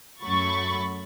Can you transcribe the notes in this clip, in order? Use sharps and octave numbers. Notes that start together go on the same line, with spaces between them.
F#2 F#3 A3 B5 C#6 A6